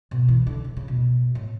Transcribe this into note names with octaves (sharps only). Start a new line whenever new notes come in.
B2
E3
D3
C#3
C#3
B2
A2